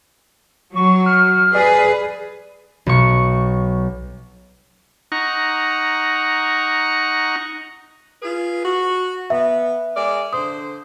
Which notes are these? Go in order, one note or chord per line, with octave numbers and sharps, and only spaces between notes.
F#3 C#6
F6
G#4 B4 D5
B1 C#6
D#4 F#5 A#5 C#6
F4 G#4 B4
F#4
B3 E5
G#3 A#4 D5
D3 C5 D#6